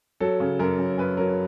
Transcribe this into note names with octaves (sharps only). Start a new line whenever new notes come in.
F#3 A4
C#3
F#2 A#4
F#2
F#2 B4
F#3 A#4